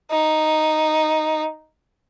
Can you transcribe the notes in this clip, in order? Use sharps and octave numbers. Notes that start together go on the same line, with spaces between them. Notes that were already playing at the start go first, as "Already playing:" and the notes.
D#4